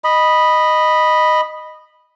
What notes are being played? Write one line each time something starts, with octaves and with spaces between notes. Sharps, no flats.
D#5 B5